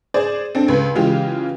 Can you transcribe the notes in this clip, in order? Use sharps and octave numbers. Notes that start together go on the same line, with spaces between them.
G#4 C5 D5
C4 D4 A4
C#2 B4
C#3 E3 G#3 F4 G4